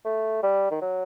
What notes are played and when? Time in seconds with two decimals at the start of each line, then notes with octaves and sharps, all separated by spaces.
0.05 A3
0.43 G3
0.71 D#3
0.81 F#3